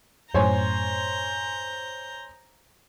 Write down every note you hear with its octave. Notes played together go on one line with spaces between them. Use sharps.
F#2 A2 C5 C#5 G#5 A#5 G6